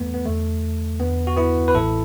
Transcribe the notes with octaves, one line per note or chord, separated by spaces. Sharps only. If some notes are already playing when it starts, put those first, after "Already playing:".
Already playing: E2 E3 A3 B3
B3
E2 D3 A3
E2 D3 B3
F#4
B3 E4
B4
A1 A2 E3 E4 A4